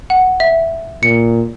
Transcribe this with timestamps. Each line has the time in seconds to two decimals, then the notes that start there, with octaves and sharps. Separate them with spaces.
0.10 F#5
0.40 E5
1.03 A#2 C#7